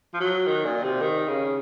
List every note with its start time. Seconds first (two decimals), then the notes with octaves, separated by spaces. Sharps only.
0.14 F3
0.20 F#3
0.47 D#3
0.65 A#2
0.83 C3
1.01 D#3
1.28 C#3